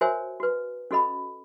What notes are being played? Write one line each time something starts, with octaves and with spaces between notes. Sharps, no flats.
F#4 A#4 C5 C#5 E5 G#5
F#4 B4
C#4 F#4 A4 D#5 B5